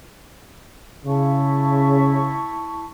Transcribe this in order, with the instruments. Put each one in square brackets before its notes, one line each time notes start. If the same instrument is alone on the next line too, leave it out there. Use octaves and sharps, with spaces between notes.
[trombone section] C#3 [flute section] E4 A5 C#6